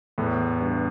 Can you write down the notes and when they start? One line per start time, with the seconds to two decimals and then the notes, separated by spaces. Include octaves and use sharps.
0.18 E2 A2
0.61 G2